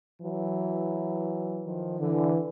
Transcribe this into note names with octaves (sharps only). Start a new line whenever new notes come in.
E3 F#3
D#3 F3
D3 E3